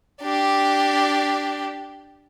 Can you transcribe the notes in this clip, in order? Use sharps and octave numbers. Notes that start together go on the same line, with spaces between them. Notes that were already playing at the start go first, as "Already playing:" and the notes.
D4 G4